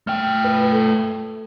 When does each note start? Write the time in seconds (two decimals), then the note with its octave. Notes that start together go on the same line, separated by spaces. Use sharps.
0.07 A3 G5 F6
0.44 B4
0.72 A4